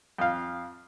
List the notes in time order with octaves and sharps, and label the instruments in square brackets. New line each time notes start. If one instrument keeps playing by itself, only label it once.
[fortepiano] F2 F5